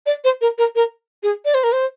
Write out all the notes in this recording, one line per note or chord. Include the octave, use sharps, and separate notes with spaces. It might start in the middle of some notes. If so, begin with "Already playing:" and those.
D5
C5
A#4
A#4
A#4
G#4
D5
C5
A#4
C5